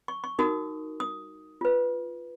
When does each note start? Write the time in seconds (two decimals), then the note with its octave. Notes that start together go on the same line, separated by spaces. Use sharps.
0.08 C#6
0.24 C#6
0.39 D#4 F#4 A#4 D#6
1.00 D#6
1.61 F4 B4